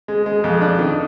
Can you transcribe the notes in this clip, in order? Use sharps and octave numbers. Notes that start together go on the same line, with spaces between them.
G#3
G#3
F2
D4
D#3